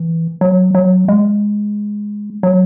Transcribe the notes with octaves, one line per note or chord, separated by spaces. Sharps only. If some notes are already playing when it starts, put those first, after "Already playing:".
Already playing: E3
F#3
F#3
G#3
F#3